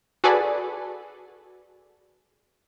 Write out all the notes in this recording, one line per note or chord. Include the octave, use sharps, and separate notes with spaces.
F#4 G#4 A4 B4 D5